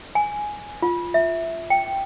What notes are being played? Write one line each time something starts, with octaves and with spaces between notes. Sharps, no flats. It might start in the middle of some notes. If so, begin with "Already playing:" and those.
G#5
F4
E5
G5